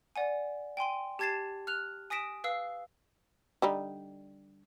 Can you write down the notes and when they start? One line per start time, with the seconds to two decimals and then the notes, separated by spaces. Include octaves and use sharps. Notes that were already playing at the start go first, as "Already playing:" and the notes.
0.16 D5 F#5 G#5
0.77 G5 G#5 C6 D#7
1.19 G4 A5 G#6 A6 C7 E7
1.67 F6 F#6 F7
2.10 G#5 D#6 A#6 B6 D7 E7
2.44 B4 F5 E6 C7
3.62 D3 G3 D#4